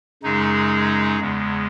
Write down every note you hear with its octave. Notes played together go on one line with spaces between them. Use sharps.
F#2 C#3 G#3 D#4 G#4
E2 C#3 G#3